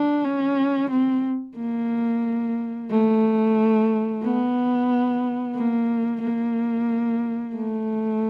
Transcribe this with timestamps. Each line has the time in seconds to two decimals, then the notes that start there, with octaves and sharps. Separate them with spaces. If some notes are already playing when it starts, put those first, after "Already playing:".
Already playing: D4
0.24 C#4
0.90 C4
1.57 A#3
2.90 A3
4.23 B3
5.56 A#3
6.22 A#3
7.55 A3